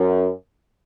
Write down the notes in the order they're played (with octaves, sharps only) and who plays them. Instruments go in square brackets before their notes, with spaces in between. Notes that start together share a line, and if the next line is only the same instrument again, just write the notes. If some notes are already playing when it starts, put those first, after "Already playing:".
Already playing: [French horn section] F#2